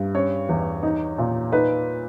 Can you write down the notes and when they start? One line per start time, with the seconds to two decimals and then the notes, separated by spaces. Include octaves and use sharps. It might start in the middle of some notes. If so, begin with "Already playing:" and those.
Already playing: G2
0.14 C#4 C#5
0.49 E2
0.83 D#4
1.18 A#2
1.52 D#4 B4